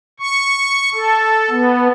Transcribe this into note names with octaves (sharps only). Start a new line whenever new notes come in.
C#6
A4
B3